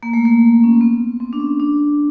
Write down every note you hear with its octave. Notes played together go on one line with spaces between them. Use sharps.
A#3
A3
A#3
C#4
C4
B3
C4
D4
C#4
D4